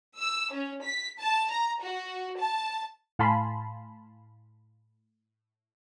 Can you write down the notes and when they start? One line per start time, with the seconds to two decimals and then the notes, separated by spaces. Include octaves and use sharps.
0.19 E6
0.52 C#4
0.84 B6
1.19 A5
1.51 A#5
1.81 F#4
2.39 A5
3.19 A2 F5 G#5 A5 B5 C6